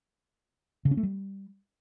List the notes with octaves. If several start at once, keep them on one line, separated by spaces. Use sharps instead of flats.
C#3
C#4
A3
G3